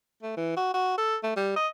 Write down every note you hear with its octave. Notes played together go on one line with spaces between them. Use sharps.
A3
E3
F#4
F#4
A4
A3
G3
D#5